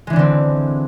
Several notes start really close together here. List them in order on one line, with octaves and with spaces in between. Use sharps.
G#3 E3 D4 D3 C4